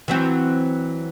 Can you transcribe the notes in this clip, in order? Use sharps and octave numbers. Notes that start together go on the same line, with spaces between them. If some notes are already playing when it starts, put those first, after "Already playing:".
E3 F#3 C4